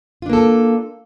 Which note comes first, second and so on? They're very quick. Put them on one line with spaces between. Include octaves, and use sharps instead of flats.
F4 D4 A#3 A4